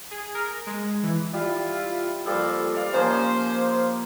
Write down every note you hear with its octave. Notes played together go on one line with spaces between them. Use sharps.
G#4
A#4
G#3
E3
G3 E4 F4
F3 G3 A#3 A4
D5 F5
F3 A#3 C#4 C5